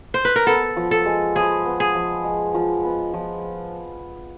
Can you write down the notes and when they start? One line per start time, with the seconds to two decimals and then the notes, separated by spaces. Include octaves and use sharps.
0.14 C5
0.25 B4
0.36 A#4
0.47 B3 A4
0.77 F3
0.91 A4
1.06 G#3
1.36 F3 G#4
1.65 B3
1.80 G#4
1.95 F3
2.24 G#3
2.54 F3
2.84 B3
3.14 F3